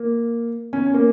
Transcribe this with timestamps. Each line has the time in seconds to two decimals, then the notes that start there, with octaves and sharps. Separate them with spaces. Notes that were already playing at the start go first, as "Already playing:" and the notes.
Already playing: A#3
0.73 C#4
0.87 C#4
0.94 A#3